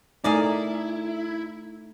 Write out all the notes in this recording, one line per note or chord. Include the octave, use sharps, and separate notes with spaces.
A3 D#4 E4 G#4 A#4 D5